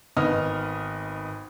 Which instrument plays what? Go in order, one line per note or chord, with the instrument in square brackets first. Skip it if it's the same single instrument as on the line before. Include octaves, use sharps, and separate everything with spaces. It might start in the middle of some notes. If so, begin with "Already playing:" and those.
[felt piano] G#1 B3 D#5 D#6 F6